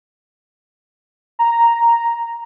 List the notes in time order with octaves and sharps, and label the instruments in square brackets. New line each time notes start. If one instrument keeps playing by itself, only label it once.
[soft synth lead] A#5